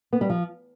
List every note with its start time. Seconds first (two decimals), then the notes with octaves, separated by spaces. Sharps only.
0.13 B3
0.21 G3
0.30 F3